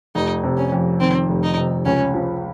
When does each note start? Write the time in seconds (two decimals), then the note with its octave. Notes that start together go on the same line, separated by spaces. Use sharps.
0.15 F1 D#4
0.43 C3
0.57 C#4
0.72 F2
1.00 D#3 C4
1.29 F1
1.43 D#4
1.57 C3
1.86 C#2 C#4
2.14 F3